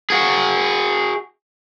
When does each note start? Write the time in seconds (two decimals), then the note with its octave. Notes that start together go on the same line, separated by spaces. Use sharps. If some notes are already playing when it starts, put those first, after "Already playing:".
0.10 F#4 G#4